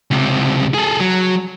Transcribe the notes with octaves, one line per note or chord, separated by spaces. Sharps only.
C#2 C3
G#4 A4
F#3